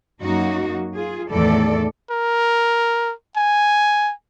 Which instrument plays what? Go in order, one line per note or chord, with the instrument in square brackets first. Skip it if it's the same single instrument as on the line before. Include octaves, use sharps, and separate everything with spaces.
[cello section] F#2 F#3 A#3 D#4 F#4
F4 G#4
E2 A2 D#3 A3 A4 D5
[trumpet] A#4
G#5